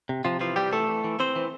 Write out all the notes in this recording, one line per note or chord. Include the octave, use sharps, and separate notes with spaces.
C3
C3 F3 F4
E3 F3 F4
C3 G3 G4
E3 A3 A4
E3
E3
E3 C4 C5
E3